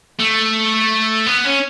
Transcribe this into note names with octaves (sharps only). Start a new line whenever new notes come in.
A3
B3
C#4